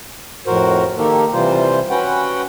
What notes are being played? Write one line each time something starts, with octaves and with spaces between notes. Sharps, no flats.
F2 A2 F#4 A#4 C5
D#3 A#3 D#4 G4 A4 A#4
C3 E3 G3 F4 C5
C#4 F#4 B4 F#5 G5